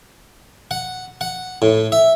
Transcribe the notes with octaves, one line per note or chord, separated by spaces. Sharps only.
F#5
F#5
A2
E5